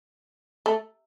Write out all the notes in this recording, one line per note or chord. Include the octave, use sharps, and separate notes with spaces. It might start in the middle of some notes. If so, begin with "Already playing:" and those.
A3